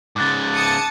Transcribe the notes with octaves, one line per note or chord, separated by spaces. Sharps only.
G#2 C#3 D6 F#6 A6
A5 D#6 C#7